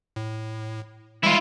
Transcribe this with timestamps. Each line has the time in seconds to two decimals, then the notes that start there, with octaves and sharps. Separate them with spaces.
0.16 A2
1.23 E3 G3 G#3 E4 F4